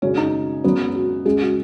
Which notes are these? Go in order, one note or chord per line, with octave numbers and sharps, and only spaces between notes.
G#1 F#2 C#3 C#4
D#4
G#1 F#2 F#3 B3
F#4
C#2 C#3 G#3 G#4
F#4